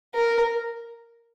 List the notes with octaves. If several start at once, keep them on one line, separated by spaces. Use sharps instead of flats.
A#4